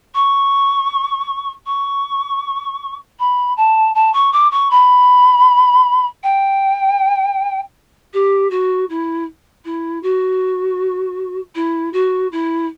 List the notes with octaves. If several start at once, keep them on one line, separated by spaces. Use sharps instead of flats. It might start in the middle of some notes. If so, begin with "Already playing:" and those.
C#6
C#6
B5
A5
A5
C#6
D6
C#6
B5
G5
G4
F#4
E4
E4
F#4
E4
F#4
E4